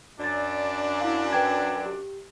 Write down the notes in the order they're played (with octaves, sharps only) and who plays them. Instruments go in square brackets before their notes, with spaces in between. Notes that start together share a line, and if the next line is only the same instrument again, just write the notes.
[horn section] F#2 D4 [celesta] D5 A6
[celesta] E4 F5
B4 G5 G#6
G4